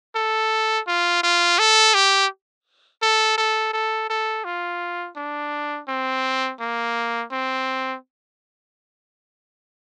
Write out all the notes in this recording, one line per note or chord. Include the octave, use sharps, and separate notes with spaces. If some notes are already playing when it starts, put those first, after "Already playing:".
A4
F4
F4
A4
G4
A4
A4
A4
A4
F4
D4
C4
A#3
C4